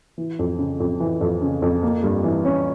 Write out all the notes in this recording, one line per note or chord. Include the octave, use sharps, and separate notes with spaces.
E3
F2
C#3
F2
E3
F2
C#3
F2
A#3
G2
E3
C#4